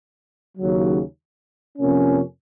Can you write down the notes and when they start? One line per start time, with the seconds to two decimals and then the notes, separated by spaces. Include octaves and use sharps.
0.58 D#2 C#3 F#3
1.78 F2 C3 F3 A#3 C#4